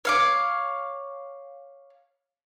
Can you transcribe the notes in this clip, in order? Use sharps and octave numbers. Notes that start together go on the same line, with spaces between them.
C#5 F5 D6